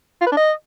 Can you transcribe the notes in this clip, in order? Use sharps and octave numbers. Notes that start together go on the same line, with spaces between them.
F4
B4
D4
D#5